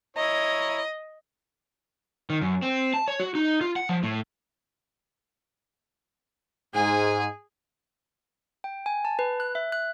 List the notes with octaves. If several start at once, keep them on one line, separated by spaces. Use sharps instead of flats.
E4 C#5 D#5 A#5
D#3
F#2
C4
A5
C#5
F#4
D#4
F4
F#5
F3
A2
G#2 G#4 G#5
G5
G#5
A5
B4
F#6
E5
F#6